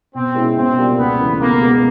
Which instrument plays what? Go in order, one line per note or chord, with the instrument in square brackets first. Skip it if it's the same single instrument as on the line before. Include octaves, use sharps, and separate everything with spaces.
[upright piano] B2 [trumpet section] C4
[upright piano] G#3 C#4 E4
[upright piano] B2 [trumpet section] C4
[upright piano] G3 A#3 D4 F4
[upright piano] C#2 [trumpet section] B3
[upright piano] C#3 E3 A3
[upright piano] B2 [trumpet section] A#3
[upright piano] G#3 B3